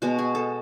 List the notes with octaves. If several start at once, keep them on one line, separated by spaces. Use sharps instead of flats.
B2 G#3 B3 F#4
G#4
A4